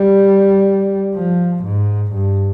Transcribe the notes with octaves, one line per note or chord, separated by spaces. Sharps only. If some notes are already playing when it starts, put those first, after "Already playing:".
Already playing: G3
F3
G#2
G2